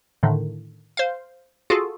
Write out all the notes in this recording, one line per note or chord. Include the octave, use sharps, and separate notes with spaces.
A2 D3 D#3
C5 F5
F4 F#4 G#4 A4